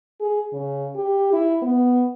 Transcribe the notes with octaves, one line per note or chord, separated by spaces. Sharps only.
G#4
C#3
G4
E4
B3